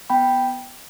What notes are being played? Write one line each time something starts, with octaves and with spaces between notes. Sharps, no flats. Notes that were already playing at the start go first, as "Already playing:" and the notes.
B3 G5 B5